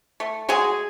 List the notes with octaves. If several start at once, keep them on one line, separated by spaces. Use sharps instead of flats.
A3
F#3 G#3 G#4